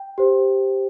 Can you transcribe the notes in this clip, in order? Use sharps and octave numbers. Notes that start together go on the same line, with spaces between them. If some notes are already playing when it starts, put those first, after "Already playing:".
Already playing: G5
G4 C5